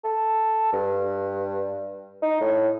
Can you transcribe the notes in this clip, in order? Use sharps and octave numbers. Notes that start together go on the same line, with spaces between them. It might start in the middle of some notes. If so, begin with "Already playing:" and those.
A4
G2
D#4
A2